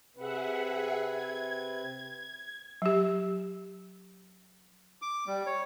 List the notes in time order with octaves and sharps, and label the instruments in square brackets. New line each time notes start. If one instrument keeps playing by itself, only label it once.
[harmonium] C3 C4 B4 [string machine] G#4 E5 F#5
[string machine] G#6
[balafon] F#3 G4
[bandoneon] D6
G3
C#5